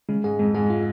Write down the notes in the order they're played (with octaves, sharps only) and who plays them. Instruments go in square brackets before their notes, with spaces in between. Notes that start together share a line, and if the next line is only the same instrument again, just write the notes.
[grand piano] C#3 [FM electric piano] G#3
[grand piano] G#2 [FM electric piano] G#4
[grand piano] F2 [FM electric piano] G#3
[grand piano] G#2 [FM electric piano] G#4
[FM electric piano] F4